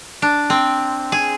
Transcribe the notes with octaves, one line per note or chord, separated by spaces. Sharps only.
D4
C4
G#4